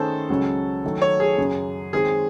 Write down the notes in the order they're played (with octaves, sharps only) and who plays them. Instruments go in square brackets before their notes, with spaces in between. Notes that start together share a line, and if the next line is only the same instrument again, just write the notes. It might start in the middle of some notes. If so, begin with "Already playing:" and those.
Already playing: [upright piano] D#3 A3 C#4 G#4 C#5 [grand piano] A4 C5
[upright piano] C#2 C#3 F#3 C#4
D#3 F#3 A3
[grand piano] C#5
G#4
[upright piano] F#2 C#3 F#3
[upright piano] D#3 G#3 C4 [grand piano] G#4